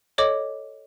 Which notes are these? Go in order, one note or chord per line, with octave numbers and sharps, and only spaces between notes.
A4 C#5 D#5 D6